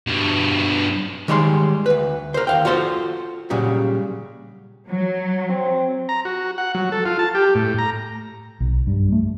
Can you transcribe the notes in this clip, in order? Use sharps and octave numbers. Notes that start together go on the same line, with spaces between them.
G2 B2
D#3 G3 G#3 C#5 G5 C6
D2 B4
A#4 C5
D#2 F5 G5
F4 F#4 A4 C5
A#2 C#3 F#3 G3
F#3
C4
A#5
F#4
F#5
F#3
A4
F4
A5
G4
A2
A#5
B1
G2
A3